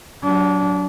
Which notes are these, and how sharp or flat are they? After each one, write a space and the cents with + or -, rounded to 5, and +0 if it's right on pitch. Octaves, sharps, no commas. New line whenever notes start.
F#3 +10 D4 -25